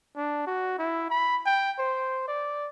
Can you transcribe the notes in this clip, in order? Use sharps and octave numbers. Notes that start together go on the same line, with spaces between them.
D4
F#4
E4
B5
G5
C5
D5